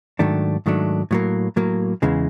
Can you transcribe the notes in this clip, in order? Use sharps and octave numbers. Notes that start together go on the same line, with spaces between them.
G#2 D#3 F#3 A3 D4
G#2 D#3 F#3 A3 D4
A2 F#3 A#3
A2 F#3 A#3
E2 C#3 E3 G#3